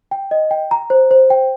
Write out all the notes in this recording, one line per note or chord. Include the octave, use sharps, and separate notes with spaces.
G5
D#5
G5
A#5
C5
C5
G5